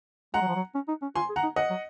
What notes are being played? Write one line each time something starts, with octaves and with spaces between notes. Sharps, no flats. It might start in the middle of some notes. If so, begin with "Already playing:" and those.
G#3 F#5 A#5
F#3
F3
F#3
C#4
D#4
C#4
F4 G#5 C6
G#4
F#5 A#5
D#4
D#5 F#5
F#3